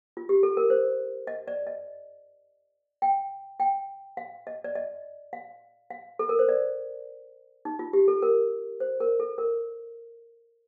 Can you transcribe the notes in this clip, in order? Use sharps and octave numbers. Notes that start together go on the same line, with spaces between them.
F4
G4
A4
A#4
C5
D#5
D5
D#5
G5
G5
F5
D#5
D5
D#5
F5
F5
A4
A#4
C5
D5
D#4
F4
G4
A4
A#4
C5
A#4
A4
A#4